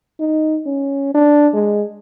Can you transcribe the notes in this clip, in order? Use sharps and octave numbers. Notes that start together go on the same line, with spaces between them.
D#4
C#4
D4
G#3